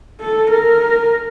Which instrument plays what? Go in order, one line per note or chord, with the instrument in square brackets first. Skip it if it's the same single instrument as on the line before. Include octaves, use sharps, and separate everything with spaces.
[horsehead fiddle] A4
A#4